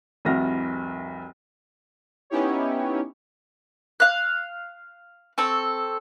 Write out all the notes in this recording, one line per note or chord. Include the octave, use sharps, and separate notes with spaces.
F1 C2 E4 F#4 F6 A#6
B3 C#4 D#4 E4 G4 C#5
F5 F#6
C4 A4 C#6